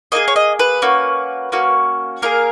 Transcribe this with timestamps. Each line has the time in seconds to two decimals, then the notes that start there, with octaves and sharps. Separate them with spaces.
0.12 A#3 D#4 G#4 D#5
0.28 C#5
0.36 D#5
0.59 B4
0.82 A#3 C#4 F#4
1.52 A#3 C#4 F#4
2.22 A#3 E4 G#4 A#4